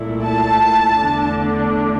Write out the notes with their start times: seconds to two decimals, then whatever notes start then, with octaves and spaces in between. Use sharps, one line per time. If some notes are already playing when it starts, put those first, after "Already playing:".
Already playing: C2 A#2 A3 E4
0.24 A5
0.98 E2 D3 A3 D4